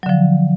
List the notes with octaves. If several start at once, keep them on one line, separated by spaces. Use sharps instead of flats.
D3 F3 F#3